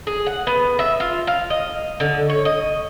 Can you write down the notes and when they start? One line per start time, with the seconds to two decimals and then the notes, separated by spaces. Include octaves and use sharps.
0.07 G#4
0.26 F#5
0.47 B3
0.79 E5
1.00 F4
1.27 F5
1.50 D#5
2.00 D3
2.29 C#5
2.45 D#5